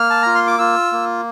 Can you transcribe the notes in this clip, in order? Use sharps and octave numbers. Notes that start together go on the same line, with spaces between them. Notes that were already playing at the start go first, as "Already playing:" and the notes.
Already playing: A#3 F6
A5
F4 A#5
C6
D6
F4 E6
A#3